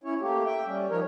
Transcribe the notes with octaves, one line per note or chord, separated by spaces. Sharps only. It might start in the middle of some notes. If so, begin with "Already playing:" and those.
C#4 E4 C#5
A3 A#3 G4
E5 G5
G3 C#4
F3 D#4 A#4 C#5